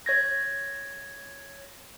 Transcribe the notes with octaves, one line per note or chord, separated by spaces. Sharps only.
C#5 G#6 A#6